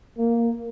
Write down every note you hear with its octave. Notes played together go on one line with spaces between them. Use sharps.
A#3